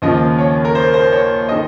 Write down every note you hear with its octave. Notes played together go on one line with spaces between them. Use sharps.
D#2 C#3 F3 D#5
C#5
A#4
C5
C5
C#5
D#3 D#5